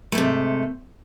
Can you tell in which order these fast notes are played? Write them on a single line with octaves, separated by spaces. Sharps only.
A3 G#2 C3